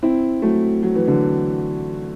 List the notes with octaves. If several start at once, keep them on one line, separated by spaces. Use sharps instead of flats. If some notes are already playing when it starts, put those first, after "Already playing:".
C4 E4
F#3 A3
F#3
E3
D3 F#3